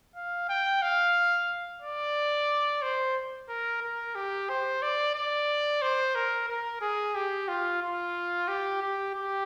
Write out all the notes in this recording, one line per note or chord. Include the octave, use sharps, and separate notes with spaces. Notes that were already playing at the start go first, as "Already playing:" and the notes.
F5
G5
F5
D5
C5
A#4
A#4
G4
C5
D5
D5
C5
A#4
A#4
G#4
G4
F4
F4
G4
G4
G4